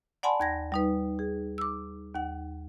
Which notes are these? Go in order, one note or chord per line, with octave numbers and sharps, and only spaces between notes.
D5 F#5 G#5 A5 B5 C6
D#2 G#6 A#6
G3 D#4 B4
G#4
D6 E6
D#2 F#5